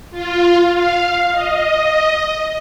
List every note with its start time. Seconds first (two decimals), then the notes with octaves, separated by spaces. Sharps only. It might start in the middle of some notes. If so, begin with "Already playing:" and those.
0.11 F4
0.73 F5
1.32 D#5